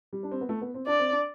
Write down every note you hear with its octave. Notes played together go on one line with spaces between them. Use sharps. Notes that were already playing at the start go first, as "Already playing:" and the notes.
G3
D4
C4
B3
A3
B3
C4
D4 D5
C4
D4